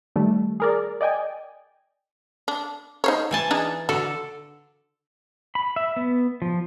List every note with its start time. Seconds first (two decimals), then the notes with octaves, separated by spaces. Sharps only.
0.16 D#3 G3 A3
0.60 G#4 A#4 D5
1.01 D5 D#5 G5 G#5
2.48 D4
3.04 D#4 C5 C#5
3.31 E3 G#5 A5
3.51 D4 D#4 G#4
3.89 D3 F#4 A4
5.55 B5
5.76 E5
5.96 B3
6.42 F3